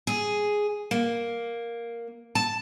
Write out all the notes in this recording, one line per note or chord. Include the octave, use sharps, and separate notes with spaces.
G#4
A#3
A5